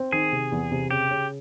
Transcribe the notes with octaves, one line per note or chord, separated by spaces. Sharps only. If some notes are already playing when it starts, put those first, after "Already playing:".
Already playing: C4
D#3 G#4
C3
E2
C3
C#3 G4
C#3